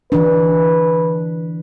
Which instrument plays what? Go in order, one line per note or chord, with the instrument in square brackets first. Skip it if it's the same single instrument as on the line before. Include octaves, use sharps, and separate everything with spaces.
[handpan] E3 D4 [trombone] B4